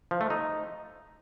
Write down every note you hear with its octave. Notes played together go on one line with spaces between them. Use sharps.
F3
A3
D#4